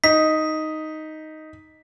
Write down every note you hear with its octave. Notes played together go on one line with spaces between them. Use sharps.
D#4 B6